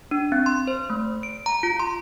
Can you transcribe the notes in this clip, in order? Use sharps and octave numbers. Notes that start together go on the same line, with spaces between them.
D4
C4
C6
C5
A3
D7
A#5
F4
C6